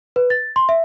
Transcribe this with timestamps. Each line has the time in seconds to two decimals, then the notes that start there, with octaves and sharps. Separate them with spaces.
0.16 B4
0.30 A6
0.56 C6
0.69 E5